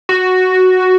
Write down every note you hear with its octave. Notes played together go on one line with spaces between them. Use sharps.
F#4